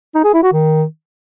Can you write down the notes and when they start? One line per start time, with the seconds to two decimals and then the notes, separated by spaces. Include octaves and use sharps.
0.15 D#4
0.24 G#4
0.34 E4
0.43 F#4
0.52 D#3